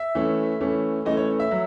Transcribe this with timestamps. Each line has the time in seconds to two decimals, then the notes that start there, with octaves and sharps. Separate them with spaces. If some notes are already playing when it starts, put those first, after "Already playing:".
Already playing: E5
0.15 E3 A3 C#4
0.61 E3 A3 C#4
1.05 E3 A3 C#4 D#5
1.17 C#5
1.40 E5
1.51 F#3